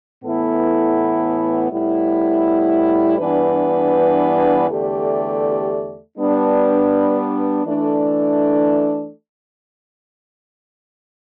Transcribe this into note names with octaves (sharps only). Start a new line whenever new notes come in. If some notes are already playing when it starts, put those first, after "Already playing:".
A2 E3 B3 E4 A4
A2 G3 B3 E4
G2 E3 B3 D4 B4
E2 D3 A3 G4 D5
G3 B3 D4 B4
E3 A3 D4 A4 D5